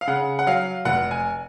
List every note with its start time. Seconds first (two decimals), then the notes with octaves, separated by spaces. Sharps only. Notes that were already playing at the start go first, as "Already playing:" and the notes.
0.01 F5
0.07 C#3 F#5
0.39 F#5
0.47 F#3 F5
0.85 F1 F#5
1.11 G#5